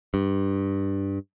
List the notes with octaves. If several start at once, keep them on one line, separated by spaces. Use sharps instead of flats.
G2